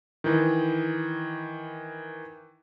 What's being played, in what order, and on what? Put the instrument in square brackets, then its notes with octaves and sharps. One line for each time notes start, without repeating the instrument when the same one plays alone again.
[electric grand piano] D#3 E3